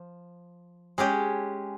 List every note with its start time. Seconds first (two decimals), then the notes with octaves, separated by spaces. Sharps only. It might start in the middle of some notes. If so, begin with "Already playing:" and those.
Already playing: F3
0.98 G#3 C#4 G4